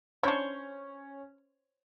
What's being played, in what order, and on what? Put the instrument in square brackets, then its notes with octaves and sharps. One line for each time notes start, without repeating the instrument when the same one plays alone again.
[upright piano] C#4 [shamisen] D4 E4 [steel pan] C5 C#5 C#6